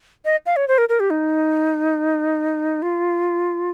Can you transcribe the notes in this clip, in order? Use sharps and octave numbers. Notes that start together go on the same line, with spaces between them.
D#5
F5
C#5
C5
A#4
A#4
G4
D#4
F4